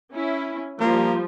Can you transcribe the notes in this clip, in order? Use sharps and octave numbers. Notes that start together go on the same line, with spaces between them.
C#4 E4
F3 G3 A#3